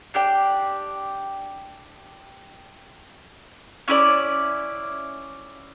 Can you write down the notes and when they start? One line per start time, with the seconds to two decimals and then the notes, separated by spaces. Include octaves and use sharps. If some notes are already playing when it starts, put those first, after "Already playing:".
0.14 D4 G4 D5 G5
3.88 C#4 E4 B4 D5